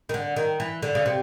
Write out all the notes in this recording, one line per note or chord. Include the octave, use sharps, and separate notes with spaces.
D#3
D3
D#3
E3
D3
C#3
C3